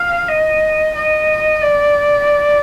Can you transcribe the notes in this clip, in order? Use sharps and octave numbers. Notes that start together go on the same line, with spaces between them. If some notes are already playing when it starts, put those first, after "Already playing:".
Already playing: F5
D#5
D#5
D5